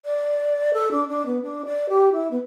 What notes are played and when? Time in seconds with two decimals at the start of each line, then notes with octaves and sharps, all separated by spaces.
0.05 D5
0.73 A4
0.91 D4
1.09 D4
1.26 B3
1.42 D4
1.65 D5
1.89 G4
2.12 E4
2.31 B3